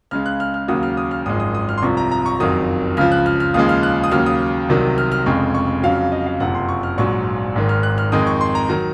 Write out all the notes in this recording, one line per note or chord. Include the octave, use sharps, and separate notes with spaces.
C#2 C#3 G#3 F6
F#6
F6
F6
D#2 C#3 F#3 D#6
F6
D#6
F6
G#1 F#2 F3 G#3 D#6
D#6
D#6
F6
C6
C2 C3 F3 C#6
A#5
A#5
C#6
F#1 F2 D#3 F#3 D#6
C#2 C#3 F3 F6
F#6
F6
F6
D#2 C#3 F3 G#3 D#6
F6
F#6
D#6
D#2 C#3 F#3 F6
D#6
C2 C3 D#3 F#3
F6
F6
F1 F2 C#3 G#3 C#6
C#6
F2 C#3 F#3 F5
D#5
F5
F#1 F2 C3 F3 F#5
C6
C#6
F6
A#1 G#2 F#3 C#6
G#1 G#2 D#3
F6
F#6
F6
F2 D#3 G#3 D#6
C#6
C6
A#5
D#3 F#3 A#5